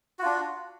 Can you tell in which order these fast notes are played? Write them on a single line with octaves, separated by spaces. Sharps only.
F#4 F4 D4